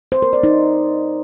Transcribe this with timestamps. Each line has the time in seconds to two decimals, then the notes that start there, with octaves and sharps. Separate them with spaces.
0.12 C5
0.22 A#4
0.33 D5
0.43 D#4